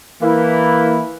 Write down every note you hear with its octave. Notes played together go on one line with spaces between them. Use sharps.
E3 A#3 E4